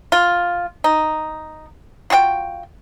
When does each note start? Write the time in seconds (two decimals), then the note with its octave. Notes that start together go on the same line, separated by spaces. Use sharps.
0.12 F4
0.84 D#4
2.10 F4 F#4 G#4 G5